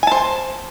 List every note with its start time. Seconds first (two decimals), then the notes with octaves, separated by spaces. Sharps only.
0.03 G#5
0.07 A5
0.11 C5